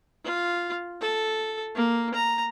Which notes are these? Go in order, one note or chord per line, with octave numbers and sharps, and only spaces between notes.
F4
A4
A#3
A#5